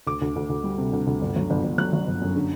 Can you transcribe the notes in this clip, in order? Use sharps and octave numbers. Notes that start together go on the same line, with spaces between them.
D2 D6
D2
D2
D2
G3
C3
D2
D2
G1
F#3
G1
G1
F#3 F#6
F#3
G1
F#2
D3